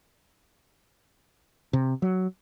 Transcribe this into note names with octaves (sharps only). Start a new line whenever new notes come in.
C3
F#3